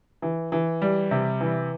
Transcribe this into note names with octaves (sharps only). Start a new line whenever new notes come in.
E3
E3
G3
C3
E3